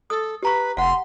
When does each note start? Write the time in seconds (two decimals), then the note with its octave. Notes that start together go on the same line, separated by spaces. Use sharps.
0.10 A4 D#6
0.43 G4 B4 A#5 C#6
0.77 F1 F5 F#5 C6